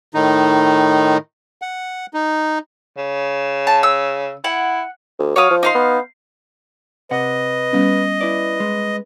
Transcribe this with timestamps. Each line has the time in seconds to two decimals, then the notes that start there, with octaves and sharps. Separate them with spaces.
0.14 A2 D#3 D#4
1.62 F#5
2.14 D#4
2.97 C#3
3.67 A5
3.83 E6
4.44 E4 F#5
5.19 D2
5.36 F#3 C#5 F5 D#6
5.51 F3
5.63 D#4 F5 C6
5.75 B3
7.11 C3 B4 D#5 F#5
7.73 G3 B3 C#4
8.21 E4 B4 D5
8.60 G#3